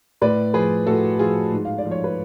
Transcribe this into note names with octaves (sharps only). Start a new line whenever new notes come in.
A2 B4 D5
F3 G#4 B4
A2 F#4 A4
F3 F4 G#4
G#2
F5
D5
F3
C#5
B4